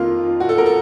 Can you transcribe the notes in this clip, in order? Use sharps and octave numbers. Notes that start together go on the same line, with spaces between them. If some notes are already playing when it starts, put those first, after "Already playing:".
Already playing: F2 D#3 A#3 F4
F#4
A4
A#4
A4